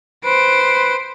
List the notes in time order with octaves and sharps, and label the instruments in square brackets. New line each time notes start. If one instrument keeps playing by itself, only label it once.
[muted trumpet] B4 [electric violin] C5 D7